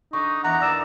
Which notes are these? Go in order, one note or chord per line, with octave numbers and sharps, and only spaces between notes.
D3 D4 D#4 C#6
E2 D5 F#5 A#5
A#3 B3 G#4 D5 E6 E7